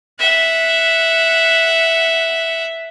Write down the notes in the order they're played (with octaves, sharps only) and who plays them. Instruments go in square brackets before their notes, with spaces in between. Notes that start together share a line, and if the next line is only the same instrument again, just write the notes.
[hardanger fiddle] E5 F#5